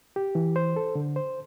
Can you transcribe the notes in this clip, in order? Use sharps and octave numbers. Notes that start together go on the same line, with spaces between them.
G4
E3
C5
A4
D3
C5